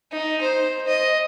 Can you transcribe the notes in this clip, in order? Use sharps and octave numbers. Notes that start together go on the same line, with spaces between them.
D#4
C5
D#5